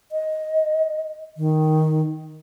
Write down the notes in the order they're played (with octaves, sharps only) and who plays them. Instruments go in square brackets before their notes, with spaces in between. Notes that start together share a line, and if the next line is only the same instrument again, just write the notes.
[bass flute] D#5
D#3